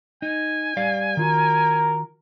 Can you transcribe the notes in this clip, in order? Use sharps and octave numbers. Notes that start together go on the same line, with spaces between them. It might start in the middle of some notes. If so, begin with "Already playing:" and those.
D#4 G#5
G3 D5 F5
D#3 F4 F#4 A#4